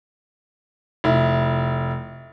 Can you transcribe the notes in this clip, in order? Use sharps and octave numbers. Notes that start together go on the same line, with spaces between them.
F1 E4